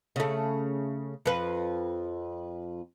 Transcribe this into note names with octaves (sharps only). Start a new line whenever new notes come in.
C#3 A3
F2 B4